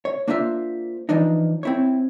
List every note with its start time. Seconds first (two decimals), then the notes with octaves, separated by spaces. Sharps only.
0.05 C#5
0.28 A#3 D4 F4 C5 E5
1.09 E3 F3 D4 D#4
1.63 C4 E4 C#5